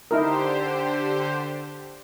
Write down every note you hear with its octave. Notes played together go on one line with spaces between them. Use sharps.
D3 D#4 E4 G4 A#4 C5